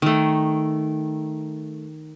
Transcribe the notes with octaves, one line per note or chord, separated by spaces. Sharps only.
D#3 A3